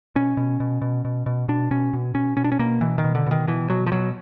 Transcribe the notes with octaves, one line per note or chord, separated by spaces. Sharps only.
B2 C#4
B2
B2
B2
B2
B2
B2 D4
B2 C#4
B2
B2 C#4
B2 C#4
D4
C#4
B2 A#3
B2 E3
D#3
B2
D3
B2 D#3
B2 E3
B2 F#3
F3
B2 F#3